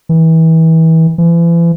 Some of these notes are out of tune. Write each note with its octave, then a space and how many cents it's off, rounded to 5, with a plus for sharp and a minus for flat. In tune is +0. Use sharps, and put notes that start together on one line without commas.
E3 -30
E3 +40